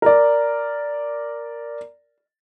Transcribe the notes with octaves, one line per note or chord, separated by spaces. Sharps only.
A#4 D5